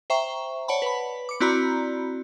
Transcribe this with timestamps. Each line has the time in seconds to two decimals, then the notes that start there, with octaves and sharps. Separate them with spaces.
0.10 C5 E5 G5 A#5 C#6
0.68 C#5 D5 F#5 A5 B5
0.82 B4 B5
1.29 D6 C#7
1.40 C4 E4 F#4 D5 A#5 B5